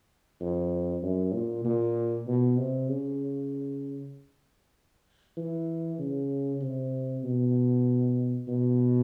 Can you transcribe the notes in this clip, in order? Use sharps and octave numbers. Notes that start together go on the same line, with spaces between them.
F2
F#2
A#2
A#2
B2
C3
C#3
E3
C#3
C3
B2
B2